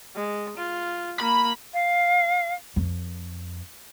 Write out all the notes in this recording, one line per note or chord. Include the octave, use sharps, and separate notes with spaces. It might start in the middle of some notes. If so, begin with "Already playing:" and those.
G#3
F4
A#3 B5
F5
F2